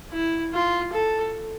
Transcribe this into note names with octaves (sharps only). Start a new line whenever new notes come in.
E4
F4
A4